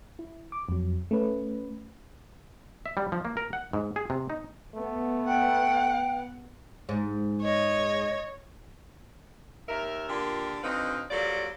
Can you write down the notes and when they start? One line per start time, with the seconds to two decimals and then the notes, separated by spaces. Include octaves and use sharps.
0.19 E4
0.52 D6
0.69 F2 F#3
1.11 A3 C#4 B4
2.86 E5
2.97 G3
3.12 F3
3.25 A#3
3.37 A#4
3.53 F#5
3.73 G#2
3.96 G#4
4.10 C3
4.30 D#4
4.75 A3 B3
5.27 F#5 G5
6.89 G#2
7.43 C#5 D#5
9.68 D#2 A#4 E5
10.09 A#2 D3 F4 G4 A#4
10.63 D2 C4 D#4 B4 D#5 F5
11.10 F#3 G3 A#3 F4 A4 D5